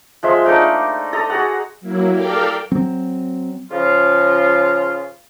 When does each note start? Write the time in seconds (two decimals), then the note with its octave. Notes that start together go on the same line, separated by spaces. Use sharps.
0.23 F3 G#3 E5 C6
0.45 A3 A#3 D4 D#4
1.13 A4 A#5 D#6
1.30 F#4 G#4 F#5
1.80 F#3 A#3 E4
2.11 G4 A4 A#4 D5 F5 G5
2.72 F#3 C4
3.71 C#3 F3 F4